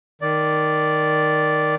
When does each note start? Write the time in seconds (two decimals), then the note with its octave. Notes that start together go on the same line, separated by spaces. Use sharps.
0.22 D#3 D5